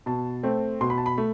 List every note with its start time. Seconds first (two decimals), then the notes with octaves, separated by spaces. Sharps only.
0.06 B2 A5
0.43 A3 C4
0.81 B2 C6
0.90 B5
0.98 A5
1.06 B5
1.18 A3